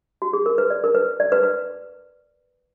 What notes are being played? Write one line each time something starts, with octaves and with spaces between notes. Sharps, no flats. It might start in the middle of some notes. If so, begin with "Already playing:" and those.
F#4
G#4
A#4
B4
D5
A#4
B4
D5
B4
B4